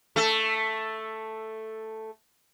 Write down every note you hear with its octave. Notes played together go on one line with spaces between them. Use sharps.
A3 A4